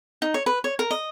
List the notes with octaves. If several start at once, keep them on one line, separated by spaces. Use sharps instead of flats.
D#4
C#5
B4
C#5
A#4
D#5